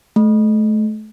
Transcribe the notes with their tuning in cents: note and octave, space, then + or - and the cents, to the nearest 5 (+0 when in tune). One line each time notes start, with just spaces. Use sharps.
A3 -35